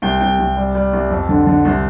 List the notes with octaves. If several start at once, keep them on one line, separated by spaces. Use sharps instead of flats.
C2 G5
C2 G5
C2
G3
G3
C2
F2
D3
D3
C2